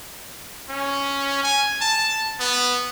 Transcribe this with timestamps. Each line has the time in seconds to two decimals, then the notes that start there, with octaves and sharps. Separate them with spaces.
0.69 C#4
1.43 G#5
1.81 A5
2.40 B3